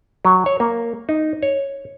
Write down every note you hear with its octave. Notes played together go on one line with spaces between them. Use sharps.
F#3
C#5
A#3
D#4
C#5